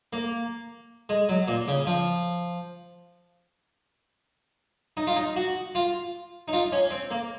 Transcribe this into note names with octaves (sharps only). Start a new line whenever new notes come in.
A#3
G#3
F#3
A#2
C#3
F3
D#4
F4
D#4
F#4
F4
D#4
F4
C#4
C4
A#3